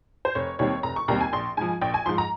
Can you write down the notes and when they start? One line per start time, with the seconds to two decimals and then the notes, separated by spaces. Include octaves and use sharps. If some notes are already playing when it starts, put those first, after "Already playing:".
0.25 C5
0.35 F1 C#5
0.59 D#2 D#3 G3 C4 C#5
0.83 F1 A#5
0.96 C#6
1.08 D#2 D#3 G3 C4 A#5
1.21 G#5
1.33 A#1 C6
1.57 G#2 F3 G#5
1.81 A#1 G5
1.94 G#5
2.06 G#2 F3 C6
2.18 A#5